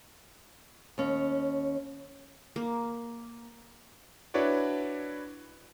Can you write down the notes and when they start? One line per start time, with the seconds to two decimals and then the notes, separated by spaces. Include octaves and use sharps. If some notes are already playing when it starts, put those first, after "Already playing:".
0.98 D#2 C#4
2.56 A#3
4.34 D4 E4 F#4 B4 C#5 D5